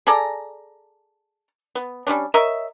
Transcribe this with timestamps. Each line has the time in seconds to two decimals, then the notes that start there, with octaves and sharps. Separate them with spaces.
0.07 G#4 A4 D5 A#5
1.75 B3
2.07 G3 G#3 C#4 D4
2.34 A#4 C#5 D#5 E5